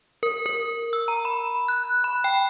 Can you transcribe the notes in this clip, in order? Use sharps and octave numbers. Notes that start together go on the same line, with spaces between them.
A#4
A#4
E6
A#5
B5
F#6
B5
G5